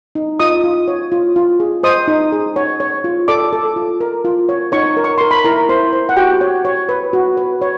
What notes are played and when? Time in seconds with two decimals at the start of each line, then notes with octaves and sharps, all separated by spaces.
0.15 D#4
0.40 F4 D#5 D#6
0.64 F4
0.88 C#5
1.12 F4
1.36 F4
1.60 G#4
1.83 C5 D#5 D#6
2.08 D#4
2.32 G#4
2.56 C#5
2.80 C#5
3.04 F4
3.28 A4 D5 D6
3.53 A4
3.76 F4
4.01 A#4
4.25 F4
4.49 C#5
4.72 D#4 C#5 C#6
4.97 A#4
5.04 C#6
5.18 A#4 C6
5.31 B5
5.44 E4 A#4 A#5
5.69 E4 C5 C6
5.93 C5
6.09 F#5
6.17 F#4 G4 G5
6.41 C#5
6.65 C#5
6.89 B4
7.13 F#4
7.37 B4
7.62 C#5